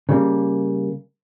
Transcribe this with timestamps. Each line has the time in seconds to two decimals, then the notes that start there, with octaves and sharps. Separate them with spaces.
0.09 C#3 G3 A#3